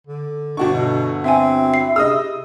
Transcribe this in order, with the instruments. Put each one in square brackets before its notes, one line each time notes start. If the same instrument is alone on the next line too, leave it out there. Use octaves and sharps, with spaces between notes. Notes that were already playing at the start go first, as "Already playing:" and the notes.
[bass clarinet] D3
[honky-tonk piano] G1 F#4 C#6 [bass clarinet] D4 [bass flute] D#4
[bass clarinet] B2 [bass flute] A4
[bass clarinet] C4 [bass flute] E4 [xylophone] E5 G#5
[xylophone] C7
[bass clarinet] C3 [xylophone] G#4 [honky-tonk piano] D#5 D#6 E6